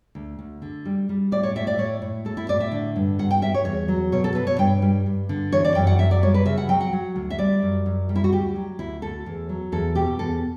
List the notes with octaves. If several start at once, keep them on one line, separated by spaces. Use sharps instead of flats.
D2
D2
D3
G3
G3
A2 D5
C#5
A2 E5
D5
A2 C#5
A2
A2 A4
E4
A2 D5
E5
D3
G2
G2 F#5
G5
G3 E5
C#5
E2 C#5
F#3
B2 C#5
A4
B2 B4
C#5
G2 G5
G3
G2
D3
E3 C#5
D5
F#2 G5
F#5
F#2 E5
D5
G3 C#5
B4
C#3 E5
F#5
F#3 G5
F#5
F#3
D2
E5
G3 D5
F#2
F#2
G3
E4
F#4
D2 G4
F#3
D2 E4
D2 A4
E2
F#3
E2 A4
B2 G4
E2 A4